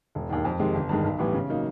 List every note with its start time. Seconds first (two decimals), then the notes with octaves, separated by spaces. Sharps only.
0.15 E1
0.29 D#2 D#3
0.45 F2
0.60 C3 D#3 G#3
0.74 G1
0.89 G2 D#3 G#3
1.04 B1
1.19 A2 E3 G3 B3
1.34 C#3
1.49 F#3 A#3 D#4